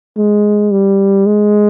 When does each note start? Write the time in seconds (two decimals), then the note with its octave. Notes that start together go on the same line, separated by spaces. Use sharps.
0.17 G#3
0.72 G3
1.26 G#3